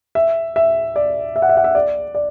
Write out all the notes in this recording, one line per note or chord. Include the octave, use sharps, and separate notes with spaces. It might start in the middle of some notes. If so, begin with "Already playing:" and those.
E5
E5
D5
E5
F#5
E5
F#5
E5
D5
D5